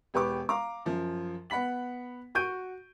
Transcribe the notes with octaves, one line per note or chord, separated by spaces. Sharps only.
E1 G4 B4 C#6 D6
F5 A#5 D6
F#2 F3
B3 F#5 B5 B6 F#7
F#4 C#6 G6 D7 D#7